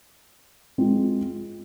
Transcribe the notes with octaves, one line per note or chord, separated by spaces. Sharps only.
G#3 C4 F4